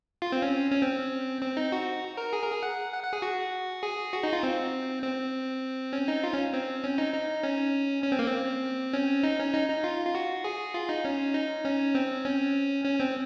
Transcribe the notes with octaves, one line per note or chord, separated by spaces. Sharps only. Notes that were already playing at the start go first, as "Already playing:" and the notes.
F4
C4
C#4
C#4
C4
C4
D#4
F#4
A#4
G#4
A#4
G#4
F#5
F#5
F#5
G#4
F#4
G#4
F#4
D#4
F4
C4
C4
C#4
D#4
F4
C#4
C4
C#4
D#4
D#4
C#4
C#4
C4
A#3
C4
C#4
D#4
C#4
D#4
D#4
F4
F4
F#4
G#4
F4
D#4
C#4
D#4
C#4
C4
C#4
C#4
C4